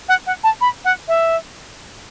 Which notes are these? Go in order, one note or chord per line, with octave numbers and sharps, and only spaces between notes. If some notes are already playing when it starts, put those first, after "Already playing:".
F#5
F#5
A5
B5
F#5
E5